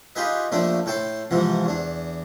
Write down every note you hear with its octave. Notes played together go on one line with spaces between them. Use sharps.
D#4 F4 G4 G#4 B4 D#5
A#1 F3 A3 D4 D5
A2 A4 G5 A5 C6
G#2 C3 E3 F3
E2 D4